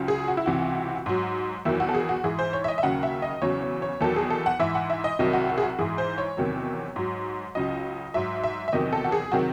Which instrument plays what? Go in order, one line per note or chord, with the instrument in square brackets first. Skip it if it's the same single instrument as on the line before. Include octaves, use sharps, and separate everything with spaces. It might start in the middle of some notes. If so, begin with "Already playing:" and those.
Already playing: [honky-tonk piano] C#2 C#3 F#3
G#4
F#4
E4
C#2 C3 E3 F#4
G#2 F#3
E2 D#3 F#3 E4
F#4
A4
G#4
F#4
G#2 E3 G#4
C5
C#5
E5
D#5
E5
D#2 C#3 F#3 F#5
E5
D#5
E2 C#3 F#3 C#5
C#5
C#5
E2 D#3 F#3 A4
G#4
A4
F#5
G#2 E3 E5
F#5
E5
D#5
C2 C3 D#3 F#3 D#5
F#4
F#4
G#4
F#4
G#2 E3 G#4
C5
C#5
E2 C3 D#3 F#3
G#2 F#3
C#2 C#3 F#3 D#5
G#2 F#3 E5
E5
E5
E2 C3 D#3 F#3 D#5
A4
F#4
G#4
C3 D#3 F#3 F#4